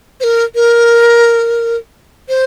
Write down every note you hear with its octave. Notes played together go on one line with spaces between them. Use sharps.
C5
A#4
A#4
C5